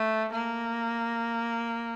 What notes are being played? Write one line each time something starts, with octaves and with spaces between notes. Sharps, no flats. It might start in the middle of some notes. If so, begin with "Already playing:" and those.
Already playing: A3
A#3